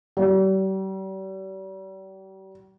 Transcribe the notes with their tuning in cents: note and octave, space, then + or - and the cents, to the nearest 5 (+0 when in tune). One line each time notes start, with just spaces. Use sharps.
G3 -40